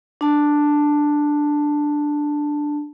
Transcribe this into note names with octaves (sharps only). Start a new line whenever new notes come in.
D4 A5